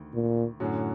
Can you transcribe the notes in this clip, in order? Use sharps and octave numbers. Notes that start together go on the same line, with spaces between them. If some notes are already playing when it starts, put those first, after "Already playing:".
Already playing: D2 D#3
A#2
F#2 A2 D3 F#3